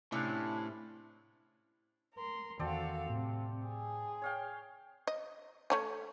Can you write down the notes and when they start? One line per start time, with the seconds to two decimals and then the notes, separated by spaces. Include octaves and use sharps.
0.12 A2 C3 C#4 D4 E4 F5
2.14 A#4 C6
2.59 E2 D#3 C4 F#4 A4 D5 F5 A5
3.09 A2 C3
3.67 G#4
4.22 C#5 F5 G5
5.07 D#5
5.70 A3 C#4 G#5